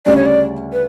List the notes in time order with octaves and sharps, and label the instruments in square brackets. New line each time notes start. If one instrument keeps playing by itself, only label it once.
[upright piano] D2 C#3 G3 C#4 [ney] D5
[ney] C#5
D5
B4